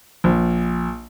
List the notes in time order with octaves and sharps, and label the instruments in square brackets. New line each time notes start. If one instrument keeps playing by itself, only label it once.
[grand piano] A#1